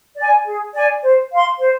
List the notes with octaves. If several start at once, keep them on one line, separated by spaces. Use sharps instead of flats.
D5 G#5
G#4
D5 G#5
C5
F5 C6
C5